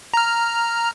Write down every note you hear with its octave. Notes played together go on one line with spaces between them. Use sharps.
A#5 F6